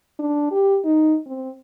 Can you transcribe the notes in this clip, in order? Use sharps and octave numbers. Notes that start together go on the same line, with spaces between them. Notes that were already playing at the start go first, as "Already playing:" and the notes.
D4
G4
D#4
C4